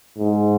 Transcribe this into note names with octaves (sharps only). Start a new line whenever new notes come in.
G#2